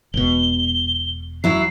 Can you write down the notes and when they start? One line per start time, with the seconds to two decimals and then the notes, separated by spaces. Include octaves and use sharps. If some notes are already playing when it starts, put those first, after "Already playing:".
0.14 E1 B2 G7
1.44 F#3 E4 C7